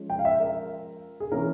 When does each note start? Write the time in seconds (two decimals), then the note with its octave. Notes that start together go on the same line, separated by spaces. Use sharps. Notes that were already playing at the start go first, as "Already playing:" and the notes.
Already playing: F3 G#3 C#4
0.10 G5
0.19 F5
0.25 E5
0.40 A#4
1.20 G#4
1.32 E3 A#3 C#4 A#4